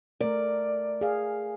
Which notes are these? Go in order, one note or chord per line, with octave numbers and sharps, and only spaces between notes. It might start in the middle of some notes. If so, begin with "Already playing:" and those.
A3 A#4 D5
G#4 F5